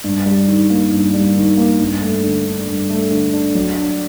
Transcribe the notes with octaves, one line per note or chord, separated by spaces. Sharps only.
G2
G3
D#3
A#3
G2
G3
D#3
A#3
G2
A3
D3
D4
G2
A3
D3
D4
F#3
D4